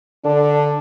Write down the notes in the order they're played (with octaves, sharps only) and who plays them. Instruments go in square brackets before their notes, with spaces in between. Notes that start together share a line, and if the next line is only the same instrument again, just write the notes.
[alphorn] D3 [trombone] D4